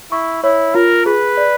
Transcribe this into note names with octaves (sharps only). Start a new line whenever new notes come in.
E4 C#6
E4 C#5
F4 A#4
G#4 B4
D5